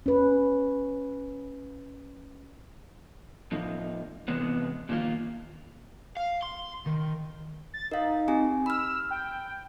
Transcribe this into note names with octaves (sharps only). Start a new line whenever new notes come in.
C#4 B4
A2 F3 D#4
C3 E3 G#3 B3
A#2 D#3 F3 A#3 F4
F5
C6
D#3
A6
D#4 A#4 F5
C4 G4 G#5
B5 E6 F6
G5